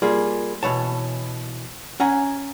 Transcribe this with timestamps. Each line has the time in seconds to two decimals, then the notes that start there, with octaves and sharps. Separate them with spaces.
0.02 G3 A#3 F4 G#4
0.63 B2 E3 C#5 A5
2.00 C#4 F#5 G#5 A#5